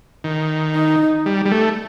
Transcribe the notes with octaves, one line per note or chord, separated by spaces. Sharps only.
D#3
D#4
G3
G3
A3